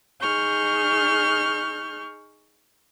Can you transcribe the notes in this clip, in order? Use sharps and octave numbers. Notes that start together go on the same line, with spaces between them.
D#4 G#4 C#6 F6 G6